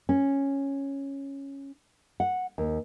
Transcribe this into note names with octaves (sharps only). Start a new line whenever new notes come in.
C#4
F#5
D#2